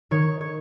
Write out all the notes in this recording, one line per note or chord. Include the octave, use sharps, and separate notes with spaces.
D#3 C#5
C#5